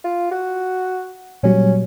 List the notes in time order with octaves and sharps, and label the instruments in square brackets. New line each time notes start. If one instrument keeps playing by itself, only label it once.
[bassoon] F4
F#4
[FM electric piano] A#2 F#3 G3 [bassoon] C#4